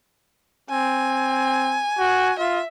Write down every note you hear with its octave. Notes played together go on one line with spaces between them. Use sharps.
C4 G#5
F#4
F4 E5